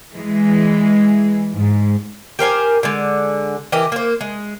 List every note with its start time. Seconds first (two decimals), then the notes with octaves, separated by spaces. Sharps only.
0.15 E3 G#3
1.56 G#2
2.39 G4 A#4 C5 G#5
2.83 D3 G#3
3.72 E3 G4 A#4 D#5
3.92 A#3 C5
4.21 G#3